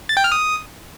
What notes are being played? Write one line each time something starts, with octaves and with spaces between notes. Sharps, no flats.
A6
G5
F6
D#6